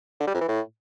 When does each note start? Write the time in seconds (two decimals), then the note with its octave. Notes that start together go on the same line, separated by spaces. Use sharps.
0.20 D3
0.27 G3
0.34 F2
0.41 E3
0.48 A2